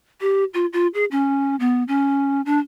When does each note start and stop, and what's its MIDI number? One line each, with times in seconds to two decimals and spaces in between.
0.21 0.44 67
0.54 0.66 65
0.73 0.87 65
0.94 1.05 68
1.11 1.56 61
1.60 1.84 59
1.88 2.41 61
2.46 2.59 62